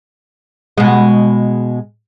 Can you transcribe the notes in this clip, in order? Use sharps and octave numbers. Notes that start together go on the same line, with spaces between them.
B2 G#3